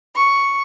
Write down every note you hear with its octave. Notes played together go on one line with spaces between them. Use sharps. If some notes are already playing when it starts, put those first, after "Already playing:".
C#6